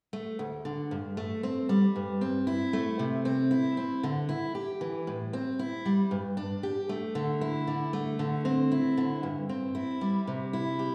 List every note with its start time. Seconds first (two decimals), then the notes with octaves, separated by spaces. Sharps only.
0.13 A3
0.39 D2
0.65 D3
0.91 G2
1.17 A3
1.43 C4
1.69 G3
1.96 G2
2.21 C4
2.47 E4
2.73 A3
2.99 C3
3.25 C4
3.51 E4
3.77 C4
4.03 D3
4.29 E4
4.55 G4
4.81 E3
5.07 A2
5.33 C4
5.59 E4
5.85 G3
6.11 G2
6.37 D4
6.63 G4
6.89 A3
7.15 D3
7.41 E4
7.67 D3
7.93 A3
8.19 D3
8.45 C4
8.71 E4
8.97 D3
9.23 G2
9.49 C4
9.75 E4
10.01 G3
10.27 C3
10.53 E4
10.79 G4